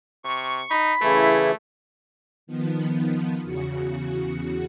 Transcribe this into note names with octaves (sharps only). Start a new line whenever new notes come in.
C3 C#6
D#4 B5
C#3 E3 A3 E4
D#3 F3 B3
E2 C#3 F#4 C#7